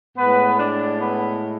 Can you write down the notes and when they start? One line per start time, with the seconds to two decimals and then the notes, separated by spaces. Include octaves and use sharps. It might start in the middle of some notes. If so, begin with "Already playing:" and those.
0.17 A2 G#3 B3 B4
0.59 D4 D5
1.01 B3 B4